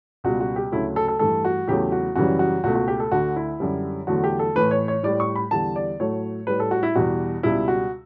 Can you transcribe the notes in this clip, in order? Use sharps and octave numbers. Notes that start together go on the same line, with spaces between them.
C#2 B2 G3 F#4
F#4
G4
D2 C#3 F#3 A3 E4
A4
A4
G2 E3 A3 A4
F#4
E2 C#3 F#3 A3 G4
F#4
F#2 C#3 E3 G3 F#4
F#4
C#2 B2 A3 F#4
F#4
G4
A4
D2 D3 A3 F#4
E4
F#2 D3 G3
E2 D3 F#3 A3 F#4
G4
A4
A2 E3 A3 B4
C#5
C#5
A2 G3 D5
C#6
B5
E2 D3 G3 A5
D5
A2 F#3 A3 C#5
A2 G3 B4
A4
F#4
E4
E2 B2 G3 F#4
C#2 B2 G3 E4
F#4